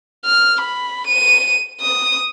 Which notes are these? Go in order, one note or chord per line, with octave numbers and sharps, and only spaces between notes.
F6
B5
D#7
D#6